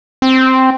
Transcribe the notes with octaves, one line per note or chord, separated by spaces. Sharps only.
C4